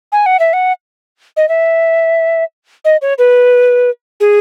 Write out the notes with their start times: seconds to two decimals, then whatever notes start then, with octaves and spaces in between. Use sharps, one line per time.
0.12 G#5
0.26 F#5
0.39 E5
0.53 F#5
1.37 D#5
1.49 E5
2.85 D#5
3.02 C#5
3.18 B4
4.20 G#4